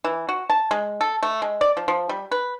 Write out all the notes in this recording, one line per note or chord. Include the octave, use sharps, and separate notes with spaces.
E3
F#4
A5
G#3
A4
A3
G#3
D5
F3
F3
G3
B4